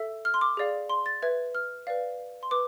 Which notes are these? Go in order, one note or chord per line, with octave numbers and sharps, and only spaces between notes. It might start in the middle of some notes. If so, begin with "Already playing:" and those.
Already playing: A4 E5
F6
C6
D6
G#4 D5 F5
C6
A6
B4 E5 G#6
F6
B4 D5 F5
C6
B4 D6